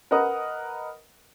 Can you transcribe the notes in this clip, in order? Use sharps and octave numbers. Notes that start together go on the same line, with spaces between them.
A#4 B4 D#5 F#5 D#6